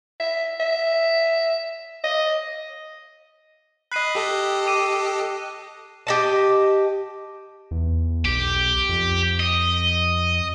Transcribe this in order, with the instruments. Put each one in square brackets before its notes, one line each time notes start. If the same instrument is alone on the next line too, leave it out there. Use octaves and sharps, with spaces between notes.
[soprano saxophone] E5
E5
D#5
[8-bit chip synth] D#5 B5 [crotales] F#6 C7 D#7
[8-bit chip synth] G4 A4 D#5
[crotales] D6 D#7
[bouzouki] G4 D#5 A5
[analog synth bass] E2
[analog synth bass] B1 [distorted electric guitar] G4
[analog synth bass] F2
[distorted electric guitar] D#5